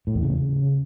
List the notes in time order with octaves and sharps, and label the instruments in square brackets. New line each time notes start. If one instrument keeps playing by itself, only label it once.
[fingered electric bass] A2
E2
C#3